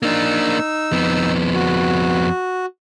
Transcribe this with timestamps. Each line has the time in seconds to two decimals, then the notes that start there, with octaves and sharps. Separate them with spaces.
0.02 A#3 D4 D#4 E6
0.92 F2 B3
1.54 F#4